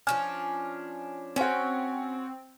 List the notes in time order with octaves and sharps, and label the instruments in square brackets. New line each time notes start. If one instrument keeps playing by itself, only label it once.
[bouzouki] F3 C#4 D4 [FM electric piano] G#5 [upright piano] F6
[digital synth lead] C4 [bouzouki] C#4 G5 [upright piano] F#4 C5 C#5